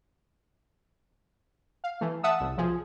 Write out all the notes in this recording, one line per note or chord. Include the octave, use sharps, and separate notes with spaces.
F5
E3 A3
E5 F#5 A5 D#6 E6
C2
B1 F3 G#4